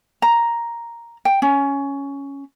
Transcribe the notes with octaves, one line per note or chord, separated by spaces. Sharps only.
A#5
G5
C#4